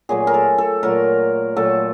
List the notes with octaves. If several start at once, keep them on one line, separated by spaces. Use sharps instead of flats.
A#2 F#3 A3 G#4
A#4
A4
A4
A#2 F#3 A3 A#4
A#2 F#3 A3 A4